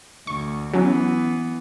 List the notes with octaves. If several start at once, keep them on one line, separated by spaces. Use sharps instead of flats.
D2 C#6
E3 F#3 B3 C#4